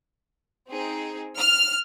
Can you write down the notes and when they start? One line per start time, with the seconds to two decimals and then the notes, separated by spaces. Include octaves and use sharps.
0.69 C4 D#4 G#4
1.38 F6